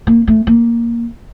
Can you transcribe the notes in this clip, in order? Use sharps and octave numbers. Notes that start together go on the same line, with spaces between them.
A#3
A3
A#3